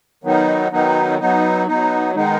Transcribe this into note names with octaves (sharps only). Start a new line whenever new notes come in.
D#3 F#3 B3 D#4
D#3 F#3 B3 D#4
F#3 B3 D#4
F#3 B3 D#4
D#3 G#3 B3 D#4